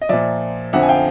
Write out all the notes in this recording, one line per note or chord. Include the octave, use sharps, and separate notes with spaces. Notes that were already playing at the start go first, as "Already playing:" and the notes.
D#5
A#2 F3 D5 E5
F2 D3 F3 E5 F#5
G#5
F5 G5